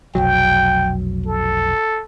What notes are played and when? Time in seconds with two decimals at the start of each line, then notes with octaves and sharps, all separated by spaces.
0.15 F1 B1 F#3 G5
1.26 A4